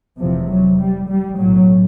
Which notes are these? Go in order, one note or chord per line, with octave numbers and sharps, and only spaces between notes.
F1 E2 C3 F3
F#3
G3
G3
B1 A2 F#3